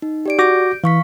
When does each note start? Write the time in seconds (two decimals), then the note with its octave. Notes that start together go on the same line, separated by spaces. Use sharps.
0.02 D#4
0.26 G4 D5 D7
0.39 F#4 D6 G6 A#6 D7
0.84 E3 F5 C#6 B6